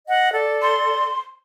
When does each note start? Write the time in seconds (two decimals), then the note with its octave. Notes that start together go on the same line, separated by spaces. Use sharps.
0.07 D#5 F#5
0.32 A4 D5
0.62 C6